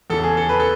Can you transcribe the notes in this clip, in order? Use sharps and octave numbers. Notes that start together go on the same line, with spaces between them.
E2 C#3 E3 A4
G#4
A4
B4
A4